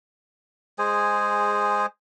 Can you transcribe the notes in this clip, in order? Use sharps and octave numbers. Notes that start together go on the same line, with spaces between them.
G#3 G#4 C5 G#5